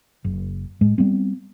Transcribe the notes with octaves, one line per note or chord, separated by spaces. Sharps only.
F#1
A2 G#3
G3 B3 C4